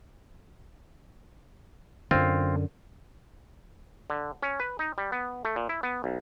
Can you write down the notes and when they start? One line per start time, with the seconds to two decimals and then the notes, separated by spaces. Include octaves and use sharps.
2.11 F#2 D3 C4 F4
4.10 D3
4.43 C#4
4.60 B4
4.79 D#4
4.98 G3
5.12 B3
5.45 A3
5.56 A#2
5.69 E4
5.83 B3
6.04 B1